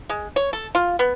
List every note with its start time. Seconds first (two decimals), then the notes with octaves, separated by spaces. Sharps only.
0.09 G#3
0.36 C#5
0.53 A4
0.75 F4
0.99 B3